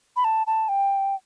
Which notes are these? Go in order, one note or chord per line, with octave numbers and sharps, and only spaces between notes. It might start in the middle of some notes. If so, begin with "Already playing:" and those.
B5
A5
A5
G5